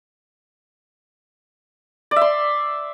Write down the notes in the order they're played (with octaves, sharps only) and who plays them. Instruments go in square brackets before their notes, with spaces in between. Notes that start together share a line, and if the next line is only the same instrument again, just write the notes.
[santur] D5
E5
C6